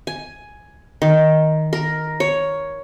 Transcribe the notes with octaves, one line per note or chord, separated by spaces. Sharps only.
G#5
D#3
A#4
C#5